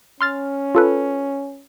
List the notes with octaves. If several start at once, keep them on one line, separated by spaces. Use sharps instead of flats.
C#4 C6 F6 A6
F4 A4 B4